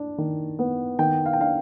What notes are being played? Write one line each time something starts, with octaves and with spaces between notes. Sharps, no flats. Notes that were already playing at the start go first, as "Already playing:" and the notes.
Already playing: D4
D#3
B3
D#3 G5
F5
G5
D4 F5